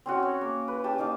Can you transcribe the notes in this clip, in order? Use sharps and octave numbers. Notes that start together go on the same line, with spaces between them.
C4 C#4 F#4
C#5
A#3
B4
C#4 G4 A5
A#3 D#4 F5 A5